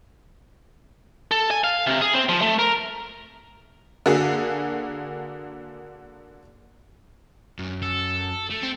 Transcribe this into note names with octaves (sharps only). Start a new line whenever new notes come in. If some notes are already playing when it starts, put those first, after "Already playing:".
A4
G#5
F5
C3
G#4
C4
F3
A3
A#4
D3 A#3 F#4 G#4
F#2
A4
A3
C4